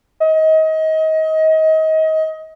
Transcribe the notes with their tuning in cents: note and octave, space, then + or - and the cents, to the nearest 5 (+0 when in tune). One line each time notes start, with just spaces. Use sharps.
D#5 +30